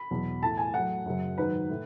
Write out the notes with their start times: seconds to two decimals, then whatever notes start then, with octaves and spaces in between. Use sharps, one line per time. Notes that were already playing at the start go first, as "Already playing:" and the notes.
Already playing: B5
0.11 E2 B2 F#3
0.42 A2 E3 A5
0.57 G#5
0.74 A2 F#3 F#5
1.06 F#2 C#3 F#3
1.38 G#2 D#3 F#3 B4
1.70 A2